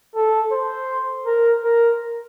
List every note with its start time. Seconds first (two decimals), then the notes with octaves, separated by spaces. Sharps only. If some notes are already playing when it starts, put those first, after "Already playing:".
0.16 A4
0.52 C5
1.26 A#4
1.63 A#4